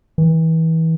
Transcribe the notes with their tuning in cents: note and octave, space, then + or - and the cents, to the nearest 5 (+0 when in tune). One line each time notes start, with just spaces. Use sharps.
E3 -30